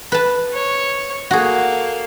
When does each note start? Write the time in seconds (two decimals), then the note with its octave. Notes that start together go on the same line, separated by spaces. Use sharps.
0.12 B4 A5
0.53 C#5
1.31 A#3 F#4 G#4 A4